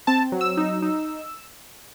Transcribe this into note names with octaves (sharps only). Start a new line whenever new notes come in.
C4 A5
F#3
E6
D#4
D#4